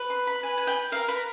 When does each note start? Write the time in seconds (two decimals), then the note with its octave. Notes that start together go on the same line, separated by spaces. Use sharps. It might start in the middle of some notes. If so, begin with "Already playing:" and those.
Already playing: B4
0.10 C6
0.27 B5
0.42 B4 G#5
0.58 G#5
0.67 G5
0.92 A#4 F5
1.08 B4